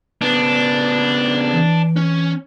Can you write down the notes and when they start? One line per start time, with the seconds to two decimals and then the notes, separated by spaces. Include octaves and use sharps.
0.22 C#3 B3 D4
1.52 E3
1.96 C#4